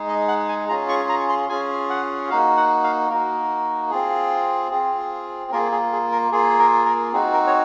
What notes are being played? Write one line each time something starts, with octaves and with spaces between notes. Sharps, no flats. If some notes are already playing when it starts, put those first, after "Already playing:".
Already playing: G#3 D#4 G#4
D#5
F#5
G#5
C#4 F4 G#4 A#5
C#6
A#5
C6
C#4 F4 G#4 G#5
F#5
A#3 D#4 F#4 F5
F#5
F5
A#3 D#4 F#4 A#4
C4 F4 G#4
C4 F4 G#4
A#3 F4 G#4 A#4
G#4
G#4
A#4
A#3 F4 G#4
A#4
A#4
C4 D#4 F#4 G#4
A#4
C#5